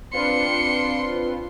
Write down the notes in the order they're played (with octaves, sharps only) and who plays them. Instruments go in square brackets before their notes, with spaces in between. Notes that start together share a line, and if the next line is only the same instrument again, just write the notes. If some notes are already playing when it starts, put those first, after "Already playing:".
[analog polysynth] C4 F4 B4 [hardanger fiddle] D4 C6 [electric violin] C#7